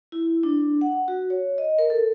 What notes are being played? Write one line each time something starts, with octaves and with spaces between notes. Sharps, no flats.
E4
D4
F#5
F#4
C#5
D#5
A#4
A4